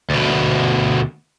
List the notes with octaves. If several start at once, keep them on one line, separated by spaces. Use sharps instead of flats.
D2 B2